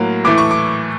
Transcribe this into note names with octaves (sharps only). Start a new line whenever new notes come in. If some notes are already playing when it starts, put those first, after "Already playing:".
Already playing: A2 F#3 A#3
A2 E3 A3 D6
C#6
D6